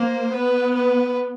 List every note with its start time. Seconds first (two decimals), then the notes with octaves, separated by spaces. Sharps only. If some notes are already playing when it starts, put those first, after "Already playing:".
Already playing: A#3 C5
0.33 B3 B4
0.74 B4